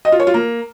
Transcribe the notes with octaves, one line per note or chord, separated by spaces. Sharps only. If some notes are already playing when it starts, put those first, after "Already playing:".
D#5
F4
C#5
F4
A#3